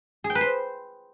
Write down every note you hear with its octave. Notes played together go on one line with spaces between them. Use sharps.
G#4
G5
B4
C5